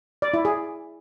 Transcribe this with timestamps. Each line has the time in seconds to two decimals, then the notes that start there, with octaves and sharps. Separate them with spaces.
0.22 D5
0.34 E4
0.45 G#4